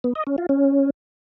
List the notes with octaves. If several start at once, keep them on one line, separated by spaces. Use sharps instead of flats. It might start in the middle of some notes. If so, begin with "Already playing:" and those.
B3
D#5
C#4
F4
C#4